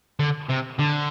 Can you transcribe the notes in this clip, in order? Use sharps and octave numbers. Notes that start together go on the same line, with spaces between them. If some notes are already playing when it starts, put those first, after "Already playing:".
D3
C3
D3